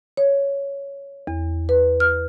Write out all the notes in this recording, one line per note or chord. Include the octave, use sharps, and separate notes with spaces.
C#5
E2
B4
F6